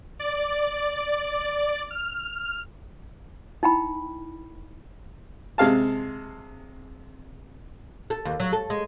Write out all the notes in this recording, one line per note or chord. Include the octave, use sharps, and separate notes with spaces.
D5
F6
D#4 E4 G5 B5
C3 G#3 F5 A5
A4
D#2
F#3
A4
G#3